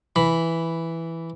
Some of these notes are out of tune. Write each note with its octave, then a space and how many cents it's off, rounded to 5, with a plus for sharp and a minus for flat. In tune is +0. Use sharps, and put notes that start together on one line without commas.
E3 +0 B5 +0